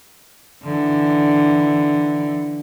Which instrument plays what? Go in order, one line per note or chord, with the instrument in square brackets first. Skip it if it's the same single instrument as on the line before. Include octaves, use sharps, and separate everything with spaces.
[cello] D3 E3